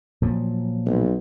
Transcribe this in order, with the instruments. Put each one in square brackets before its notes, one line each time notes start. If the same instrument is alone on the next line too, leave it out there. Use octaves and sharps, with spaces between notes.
[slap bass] A#2 F3 F#3
[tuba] B1